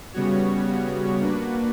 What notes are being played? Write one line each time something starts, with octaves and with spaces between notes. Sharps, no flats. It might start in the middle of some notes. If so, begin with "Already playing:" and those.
C#3 G3 B3 F#4 C#5
A#3 D4 F#4 B4